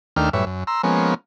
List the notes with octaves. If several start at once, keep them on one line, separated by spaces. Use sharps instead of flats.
D#2 D#3 A3 D4 G5 F6
F#2 A2 G3 B4 C#5 E5
F#2
A#5 C6 E6
F3 G#3 A#3 B3 C#4